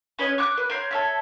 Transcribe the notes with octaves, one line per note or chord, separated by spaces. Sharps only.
C#4 B4 C#5 D#5
C#6 D6 F#6
B4
A#4 C5 C#5
A4 C#5 E5